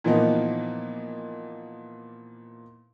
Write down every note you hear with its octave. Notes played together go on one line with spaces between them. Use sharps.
A#2 E3 F3 A#3 B3 D#4